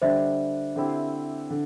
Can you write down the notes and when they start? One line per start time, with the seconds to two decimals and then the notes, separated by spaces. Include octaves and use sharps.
0.02 D3 G3 D4 C5 E5
0.76 D3 C4 E4 G4
1.50 D3